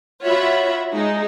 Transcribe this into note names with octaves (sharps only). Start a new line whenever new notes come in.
F4 F#4 C#5 E5 F#5 B5
G#3 D#4